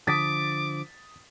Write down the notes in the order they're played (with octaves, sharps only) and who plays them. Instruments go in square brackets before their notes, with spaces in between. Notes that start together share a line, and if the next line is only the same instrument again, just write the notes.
[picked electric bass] D3 F3 [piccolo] D6 [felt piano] D#6 A6 B6